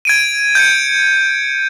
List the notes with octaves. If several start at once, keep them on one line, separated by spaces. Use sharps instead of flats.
G#6 D7 D#7
G6 G#6 C#7